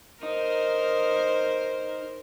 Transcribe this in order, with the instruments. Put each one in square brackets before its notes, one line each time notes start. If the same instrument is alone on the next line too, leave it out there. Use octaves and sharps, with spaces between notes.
[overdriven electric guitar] D#4 [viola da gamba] A#4 C5